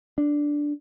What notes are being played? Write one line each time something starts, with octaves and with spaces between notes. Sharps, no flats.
D4